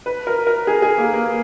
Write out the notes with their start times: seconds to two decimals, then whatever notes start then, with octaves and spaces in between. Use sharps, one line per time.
0.06 B4
0.27 A#4
0.47 A#4
0.67 G#4
0.82 G#4
0.98 A#3
1.13 A#3